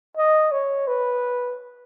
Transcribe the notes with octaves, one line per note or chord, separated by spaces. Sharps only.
D#5
C#5
B4